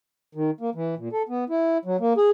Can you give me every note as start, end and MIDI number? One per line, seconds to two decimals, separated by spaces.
0.35 0.51 51
0.61 0.70 58
0.75 0.95 52
0.98 1.09 46
1.12 1.23 69
1.29 1.44 59
1.49 1.78 64
1.85 1.97 54
2.00 2.13 58
2.17 2.30 68